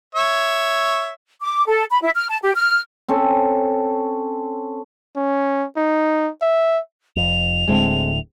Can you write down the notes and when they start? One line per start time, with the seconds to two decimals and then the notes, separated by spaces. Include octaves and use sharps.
0.15 C#5 E5
1.41 D6
1.68 A4
1.91 B5
2.02 E4
2.16 F6
2.29 A5
2.42 G4
2.55 F6
3.08 C4 C#4 A4
5.16 C#4
5.77 D#4
6.42 E5
7.16 F1 F2 F7
7.68 D1 A2 D3 G#3 C4